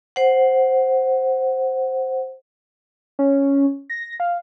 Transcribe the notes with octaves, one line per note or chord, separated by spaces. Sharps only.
C5 F#5
C#4
A#6
F5